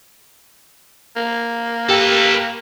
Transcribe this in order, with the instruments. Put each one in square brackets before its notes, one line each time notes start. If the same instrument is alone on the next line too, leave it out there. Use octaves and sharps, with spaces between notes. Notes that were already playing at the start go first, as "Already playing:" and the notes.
[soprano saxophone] A#3
[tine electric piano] G4 G5 [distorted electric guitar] A4 B4